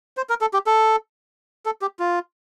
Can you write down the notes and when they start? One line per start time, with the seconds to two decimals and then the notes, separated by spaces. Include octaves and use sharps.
0.17 C5
0.29 A#4
0.41 A4
0.54 G4
0.66 A4
1.66 A4
1.82 G4
1.99 F4